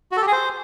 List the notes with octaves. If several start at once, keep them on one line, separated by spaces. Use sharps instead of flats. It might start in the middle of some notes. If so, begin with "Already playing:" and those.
F#4
A4
G4
G#4
C5